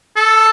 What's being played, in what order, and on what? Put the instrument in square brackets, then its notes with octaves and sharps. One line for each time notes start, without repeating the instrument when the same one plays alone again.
[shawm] A4